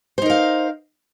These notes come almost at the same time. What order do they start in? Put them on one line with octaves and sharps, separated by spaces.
C5 D#4 A#4 F5